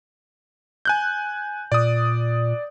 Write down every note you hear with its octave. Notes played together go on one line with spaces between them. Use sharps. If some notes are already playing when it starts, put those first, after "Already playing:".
G#5 F#6 G6
A#2 D5 D#6